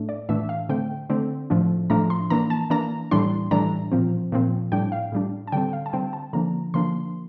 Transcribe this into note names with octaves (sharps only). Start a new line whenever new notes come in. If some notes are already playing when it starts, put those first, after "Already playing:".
Already playing: A2 A3 D4
D5
A2 E3 A3 D4 E5
F5
D3 A3 C4 G5
D3 A3 C4
A2 F3 A3 D4
A2 F3 A3 D4 A#5
C6
E3 A#3 D4 A#5
A5
E3 A#3 D4 A#5
A2 E3 G3 D4 C6
A2 E3 G3 D4 A#5
A#2 F3 C4
A#2 F3 C4
A2 G3 D4 G5
F5
A2 G3 D4
A5
D3 G3 C4 G5
F5
A5
D3 G3 C4 G5
A5
D3 F3 A#3 D4 A#5
D3 F3 A#3 D4 C6